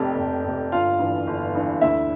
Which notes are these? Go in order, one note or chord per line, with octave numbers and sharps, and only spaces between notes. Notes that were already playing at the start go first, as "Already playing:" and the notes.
Already playing: F1 F2 C3 G4
F1
F2 C3
G1 F4 F5
G2 E3
G1
G2 E3
D2 E4 E5